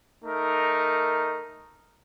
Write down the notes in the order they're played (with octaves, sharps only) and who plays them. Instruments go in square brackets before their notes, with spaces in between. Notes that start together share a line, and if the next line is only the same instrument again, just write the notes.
[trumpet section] A3 D#4 A#4